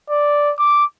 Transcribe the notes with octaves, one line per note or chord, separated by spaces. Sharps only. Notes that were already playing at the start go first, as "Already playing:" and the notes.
D5
D6